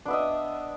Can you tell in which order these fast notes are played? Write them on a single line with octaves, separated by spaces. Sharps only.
D4 B3 E5 D#5